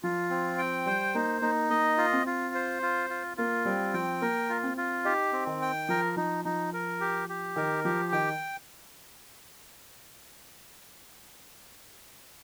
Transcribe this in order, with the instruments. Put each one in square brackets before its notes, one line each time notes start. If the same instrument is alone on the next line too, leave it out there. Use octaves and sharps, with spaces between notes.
[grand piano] F3 [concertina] F4
[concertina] C4
G5
[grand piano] G3 [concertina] C5
[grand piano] A#3 [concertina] D#4
[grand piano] A#3 [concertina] D#4
[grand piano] A#3 [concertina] D#5
[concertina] F4
[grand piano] C4
[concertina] F4
C5
F4
F4
[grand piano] A#3 [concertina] F4
[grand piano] G3 [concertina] C4
[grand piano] F3 [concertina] G5
[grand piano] A#3 [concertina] A#4
[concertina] F4
[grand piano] C4
[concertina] F4
[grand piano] D#4 [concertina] G4
[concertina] C4
[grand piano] D#3
[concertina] G5
[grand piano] F3 [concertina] A#4
[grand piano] F3 [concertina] D#4
[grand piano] F3 [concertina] D#4
[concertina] A#4
G4
G4
[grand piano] D#3 [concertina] A#4
[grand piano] F3 [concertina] G4
[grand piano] D#3 [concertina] G5